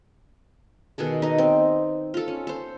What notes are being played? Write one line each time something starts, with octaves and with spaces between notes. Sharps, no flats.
B2 D#3 G#4 A4
D#4 D#5
C4
F4 A4
C#4
A4 C5